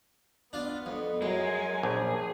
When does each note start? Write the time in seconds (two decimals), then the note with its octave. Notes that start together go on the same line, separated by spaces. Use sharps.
0.53 B3 D4 F4
0.86 F2
1.22 F#2 G#3 A#4 G#5
1.83 A#1 G#4